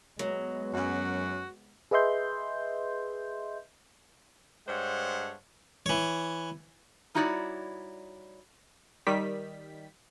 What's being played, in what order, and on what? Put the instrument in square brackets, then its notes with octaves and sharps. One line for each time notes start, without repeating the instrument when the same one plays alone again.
[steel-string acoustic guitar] F#3 [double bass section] G#3 B3
[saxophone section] F#2 [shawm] F#4
[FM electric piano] G#4 B4 D#5 E5 C6 G6
[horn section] G2 G#3 D4 C5 C#5 F#5
[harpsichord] E3 C#5
[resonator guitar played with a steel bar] G3 D#4 E4 F#4 C#5 D5
[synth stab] D#3 G3 B6